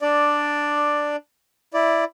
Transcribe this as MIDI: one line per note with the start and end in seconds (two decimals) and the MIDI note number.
0.01 1.16 62
0.01 1.16 74
1.74 2.04 64
1.74 2.04 74